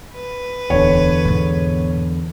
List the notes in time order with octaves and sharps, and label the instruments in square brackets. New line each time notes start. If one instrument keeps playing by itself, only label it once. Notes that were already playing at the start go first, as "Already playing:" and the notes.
[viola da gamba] B4
[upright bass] D1 [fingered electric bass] E2 D3 [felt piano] C#5
[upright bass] G#2 B2